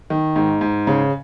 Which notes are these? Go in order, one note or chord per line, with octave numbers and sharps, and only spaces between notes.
D#3
G#2
G#2
C#3